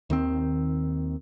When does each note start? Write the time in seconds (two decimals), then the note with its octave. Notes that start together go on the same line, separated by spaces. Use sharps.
0.10 D#2 D#3 C4